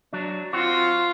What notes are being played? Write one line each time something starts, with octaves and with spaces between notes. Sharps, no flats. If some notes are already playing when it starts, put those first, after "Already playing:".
F#3 D4
C4 F4 F#4